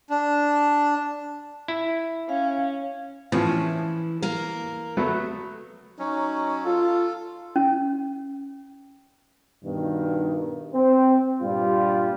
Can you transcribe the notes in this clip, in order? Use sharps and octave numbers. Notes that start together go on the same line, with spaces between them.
D4
E4
C#4 F5
A2 E3 F3 C#4
A#3 A#4
F#3 A3 B3
F#3 C#4 D#4
F4 A4
C#4
G2 B2 D#3
C4
G2 A#2 G3 F4